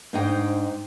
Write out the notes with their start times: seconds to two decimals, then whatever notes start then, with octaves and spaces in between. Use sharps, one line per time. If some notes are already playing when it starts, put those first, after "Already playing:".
0.13 G#2 D4 D#4 C5 D#5 G5